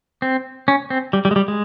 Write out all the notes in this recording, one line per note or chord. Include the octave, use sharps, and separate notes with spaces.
C4
C#4
C4
G3
G3
G#3
G3
G#3